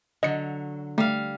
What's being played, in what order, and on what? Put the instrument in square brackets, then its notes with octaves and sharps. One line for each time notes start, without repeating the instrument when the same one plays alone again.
[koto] D3 F#3 [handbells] D#5 C#7
[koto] G3 F5 [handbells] A3